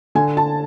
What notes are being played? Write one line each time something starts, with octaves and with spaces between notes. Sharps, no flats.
D3 G#5
A5